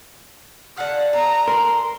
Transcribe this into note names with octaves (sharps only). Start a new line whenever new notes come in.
D3 A3 F5 F#5
A4 A#5
A#4 C6